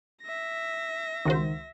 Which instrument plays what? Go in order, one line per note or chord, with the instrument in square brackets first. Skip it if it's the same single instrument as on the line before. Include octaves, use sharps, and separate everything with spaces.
[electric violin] E5 A#6
[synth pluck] C#2 F#4 C5 [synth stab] D#3